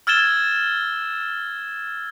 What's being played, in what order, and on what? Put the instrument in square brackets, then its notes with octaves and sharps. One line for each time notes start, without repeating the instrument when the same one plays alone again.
[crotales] E6 F6 G#6 A6 E7 G7